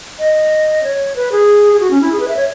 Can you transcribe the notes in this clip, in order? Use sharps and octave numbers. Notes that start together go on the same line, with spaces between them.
D#5
C#5
B4
G#4
G#4
F#4
C#4
E4
G#4
B4
E5
C#5